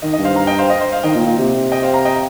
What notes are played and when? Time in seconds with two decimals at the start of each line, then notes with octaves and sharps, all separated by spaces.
0.02 D#3 D#5
0.13 D#5
0.18 G2
0.25 C5 F5
0.36 F5 A#5
0.47 D#5 G5
0.58 C5 F5
0.70 D#5
0.81 C5
0.92 C5 F5
1.03 D#3 D#5 G5
1.15 A#2
1.26 A#2
1.38 C3
1.72 D#5 G5
1.83 C5 F5
1.94 F5 A#5
2.05 D#5 G5